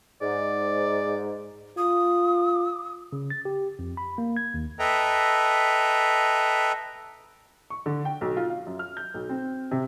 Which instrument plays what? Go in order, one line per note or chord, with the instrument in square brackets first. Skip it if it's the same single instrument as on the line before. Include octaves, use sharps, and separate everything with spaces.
[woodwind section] G#2 [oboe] D5
[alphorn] F4 [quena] D#6
[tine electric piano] C#3
A6
G4
F2
B5
A#3
G#6
D#2
[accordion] A4 B4 D#5 E5 G5 A#5
[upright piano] C#6
D3
G5
B1
F4
F5
F#2
F6
G6
B1
C4
C3